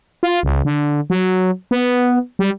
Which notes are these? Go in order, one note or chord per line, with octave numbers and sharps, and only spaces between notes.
F4
C#2
D3
F#3
B3
G3